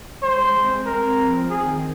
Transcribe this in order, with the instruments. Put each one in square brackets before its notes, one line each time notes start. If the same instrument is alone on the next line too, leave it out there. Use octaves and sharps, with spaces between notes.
[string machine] G#3 [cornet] C5
[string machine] C4
[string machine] C4 [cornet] A#4
[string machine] F3
[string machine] D#3 [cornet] G#4